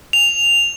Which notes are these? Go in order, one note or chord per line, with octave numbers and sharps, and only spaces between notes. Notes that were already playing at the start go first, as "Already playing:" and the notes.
F7